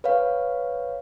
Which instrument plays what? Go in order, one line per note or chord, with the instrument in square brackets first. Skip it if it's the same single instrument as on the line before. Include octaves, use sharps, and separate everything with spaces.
[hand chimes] B4 C#5 F5